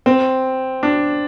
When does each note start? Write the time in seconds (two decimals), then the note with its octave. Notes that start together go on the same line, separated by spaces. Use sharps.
0.06 C4
0.83 D4